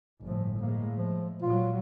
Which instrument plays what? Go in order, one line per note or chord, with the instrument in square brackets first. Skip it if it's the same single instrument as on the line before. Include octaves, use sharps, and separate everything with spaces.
[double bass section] G1 A2 [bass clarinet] F3
[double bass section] A2 G#3 [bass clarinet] A#3
[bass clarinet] F3
[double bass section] A#2 F#3 [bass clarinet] F4